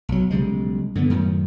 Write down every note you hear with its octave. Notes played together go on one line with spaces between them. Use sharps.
B1 F#3
B1 C#3 G3 G#3
G2 D3 A3 B3
F#2 A2 D#3